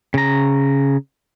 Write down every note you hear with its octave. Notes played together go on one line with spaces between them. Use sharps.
C#3 A#5